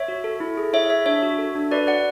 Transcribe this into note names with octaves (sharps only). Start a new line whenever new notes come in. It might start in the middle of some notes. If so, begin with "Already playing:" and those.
Already playing: C#5 E5
F#4
A4
E4
G#4
E4 C#5 E5
G#4 C#5 E5
D4 C#5 E5
F#4
A4
D4
F#4 B4 D5
A4 D5 F#5